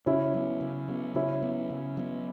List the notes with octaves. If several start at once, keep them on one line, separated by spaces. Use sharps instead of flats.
C#3 C#4 E4
F#3 B3
C#3
F#3 B3
C#3 C#4 E4
F#3 B3
C#3
F#3 B3